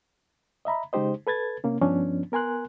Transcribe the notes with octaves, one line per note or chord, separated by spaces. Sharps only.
D#5 E5 A#5 B5
C#3 G#3 D#4 G4 C5 D#5
A4 B4 G#6 A6
C3 A#3 C#4
G2 F3 B3 C#4 D4
B3 A#4 G#5 C6 F#6